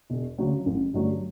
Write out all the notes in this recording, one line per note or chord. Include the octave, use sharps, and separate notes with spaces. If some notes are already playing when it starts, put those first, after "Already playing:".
E1
D2 C#3 F#3
A1
G2 D3 F#3 A3